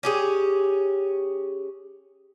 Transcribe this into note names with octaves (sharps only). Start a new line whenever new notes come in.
C#4 G4 G#4